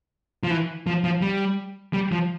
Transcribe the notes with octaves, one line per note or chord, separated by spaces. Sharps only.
F3
E3
F3
F3
G3
G3
F3